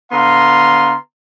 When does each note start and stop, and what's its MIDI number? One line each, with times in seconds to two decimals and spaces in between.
0.12 0.94 50
0.12 0.94 59
0.12 0.94 77
0.12 0.94 82
0.12 0.94 84